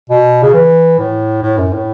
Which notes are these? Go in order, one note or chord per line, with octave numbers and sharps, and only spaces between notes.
B2
C#3
E3
A2
A2
F#2
A2